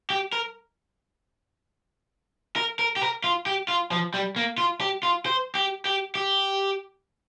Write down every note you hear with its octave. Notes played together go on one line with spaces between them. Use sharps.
G4
A#4
A#4
A#4
G4
A#4
F4
G4
F4
F3
G3
A#3
F4
G4
F4
C5
G4
G4
G4